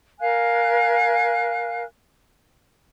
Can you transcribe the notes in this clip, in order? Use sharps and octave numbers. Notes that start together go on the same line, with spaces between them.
A#4 F5 G#5 F#6